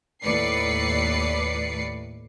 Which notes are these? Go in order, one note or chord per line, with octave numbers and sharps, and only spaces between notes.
D#2 A2 B4 D5 C7 C#7